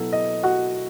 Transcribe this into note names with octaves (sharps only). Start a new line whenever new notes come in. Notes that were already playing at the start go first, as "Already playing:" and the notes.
Already playing: B2 F#3 B3 E4 A4
D#5
F#4 F#5